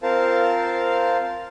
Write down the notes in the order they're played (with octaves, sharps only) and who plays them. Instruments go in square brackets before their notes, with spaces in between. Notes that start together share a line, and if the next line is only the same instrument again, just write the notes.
[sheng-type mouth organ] C4 F4 A#4 C5 F5 A5